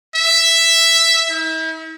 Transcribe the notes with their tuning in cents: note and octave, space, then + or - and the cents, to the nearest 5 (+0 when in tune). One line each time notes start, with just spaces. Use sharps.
E5 +5
E4 -45